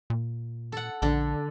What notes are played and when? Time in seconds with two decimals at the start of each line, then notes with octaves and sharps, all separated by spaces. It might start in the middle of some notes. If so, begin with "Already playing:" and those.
0.10 A#2
0.72 A4 F#5
1.02 A#1 D3 A4